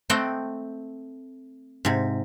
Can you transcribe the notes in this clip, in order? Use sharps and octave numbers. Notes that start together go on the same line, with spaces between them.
A3 C4 D#5 F#5 G5
G#2 C3